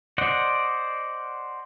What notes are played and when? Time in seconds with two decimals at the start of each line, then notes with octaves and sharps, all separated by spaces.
0.18 C5 D5 D#5 F#5